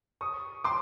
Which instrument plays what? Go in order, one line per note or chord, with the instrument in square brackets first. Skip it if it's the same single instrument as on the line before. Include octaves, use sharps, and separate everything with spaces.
[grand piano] C#6 D#6
C6 D6